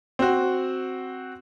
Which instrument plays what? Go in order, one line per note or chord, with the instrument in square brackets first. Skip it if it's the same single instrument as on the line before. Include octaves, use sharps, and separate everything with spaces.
[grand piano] C4 F#4